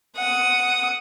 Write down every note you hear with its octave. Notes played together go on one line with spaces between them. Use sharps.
F#5 D#6